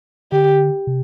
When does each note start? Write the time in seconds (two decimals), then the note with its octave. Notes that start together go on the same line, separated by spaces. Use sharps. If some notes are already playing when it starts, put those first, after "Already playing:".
0.32 D3 G4
0.87 C3